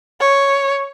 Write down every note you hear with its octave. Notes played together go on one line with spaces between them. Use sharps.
C#5